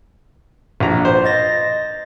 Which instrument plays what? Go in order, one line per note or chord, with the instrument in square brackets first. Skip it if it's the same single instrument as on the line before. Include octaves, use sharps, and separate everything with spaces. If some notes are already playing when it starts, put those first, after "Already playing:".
[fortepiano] A#1 A#5
C5
[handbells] D#5 A6 A#6